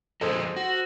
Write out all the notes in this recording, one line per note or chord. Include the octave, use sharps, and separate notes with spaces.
F2 G#4 A4 C5 D#5 D#6
F#4